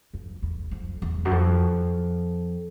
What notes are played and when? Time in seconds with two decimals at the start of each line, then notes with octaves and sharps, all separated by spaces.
0.14 F2
0.42 E2
0.71 F2
1.02 E2
1.25 F#2
1.31 F2